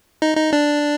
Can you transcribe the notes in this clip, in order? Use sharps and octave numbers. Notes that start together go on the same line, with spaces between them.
D#4
D#4
D4